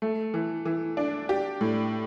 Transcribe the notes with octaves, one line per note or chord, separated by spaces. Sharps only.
A3
E3
E3
D4
G4
A2